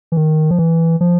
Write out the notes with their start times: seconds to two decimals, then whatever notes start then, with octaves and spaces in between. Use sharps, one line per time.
0.12 E3
0.17 D#3
0.51 F3
0.59 E3
1.01 F3